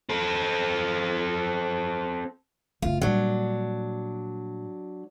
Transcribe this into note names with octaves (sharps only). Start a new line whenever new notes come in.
C4 A4
F#1 A3 F4
A#2 F#3 G3 D4